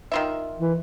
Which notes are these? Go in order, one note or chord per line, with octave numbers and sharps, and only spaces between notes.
D#3 F4 E5
E3